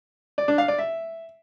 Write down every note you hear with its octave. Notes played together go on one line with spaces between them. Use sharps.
D5
D4
F5
D5
E5